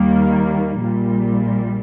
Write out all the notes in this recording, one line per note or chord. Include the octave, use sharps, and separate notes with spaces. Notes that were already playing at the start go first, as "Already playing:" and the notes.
Already playing: D#2 D#3 G3 A#3
A#1 A#2 G3